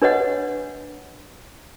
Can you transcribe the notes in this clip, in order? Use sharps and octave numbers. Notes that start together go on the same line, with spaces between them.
D4 B4 C#5 D#5 F#5